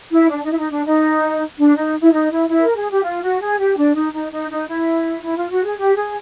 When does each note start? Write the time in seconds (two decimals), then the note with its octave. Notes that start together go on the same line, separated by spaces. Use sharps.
0.12 E4
0.30 D4
0.44 D#4
0.51 E4
0.58 D#4
0.71 D4
0.85 D#4
1.58 D4
1.76 D#4
2.01 E4
2.13 D#4
2.31 E4
2.49 E4
2.58 B4
2.63 A#4
2.76 G#4
2.91 G4
3.04 F4
3.22 F#4
3.40 G#4
3.59 G4
3.77 D4
3.95 D#4
4.13 D#4
4.32 D#4
4.51 D#4
4.68 E4
5.23 E4
5.37 F4
5.50 F#4
5.65 G#4
5.78 G4
5.96 G#4